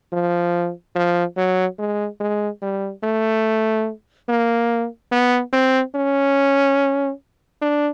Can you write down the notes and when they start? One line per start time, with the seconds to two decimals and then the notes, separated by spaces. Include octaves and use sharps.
0.12 F3
0.95 F3
1.37 F#3
1.79 G#3
2.20 G#3
2.62 G3
3.03 A3
4.29 A#3
5.12 B3
5.53 C4
5.95 C#4
7.62 D4